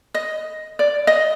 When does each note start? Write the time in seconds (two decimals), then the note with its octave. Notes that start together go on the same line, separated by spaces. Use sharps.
0.14 D#5
0.79 D5
1.07 D#5